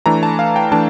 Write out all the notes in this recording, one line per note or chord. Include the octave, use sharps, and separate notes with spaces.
E3 A3 D4 A#5
A5
F5
G5
E3 A3 D4 A5